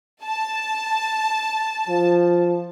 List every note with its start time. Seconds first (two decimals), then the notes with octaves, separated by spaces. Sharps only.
0.23 A5
1.88 F3